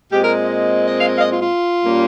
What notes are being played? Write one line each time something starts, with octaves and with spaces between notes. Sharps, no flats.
A#2 G#3 C4 G4
A#4
D#5
D#5
F5
D#5
F5
D#5
F4
F4
A#2 G3 A#3 C#4